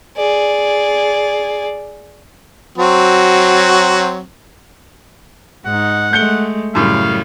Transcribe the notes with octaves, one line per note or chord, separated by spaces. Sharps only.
G#4 D5
F#3 C4 F#4
G#2 D#4 F#5
G#3 A3 G6 C#7 G7
F#2 A2 C#3 G3 F5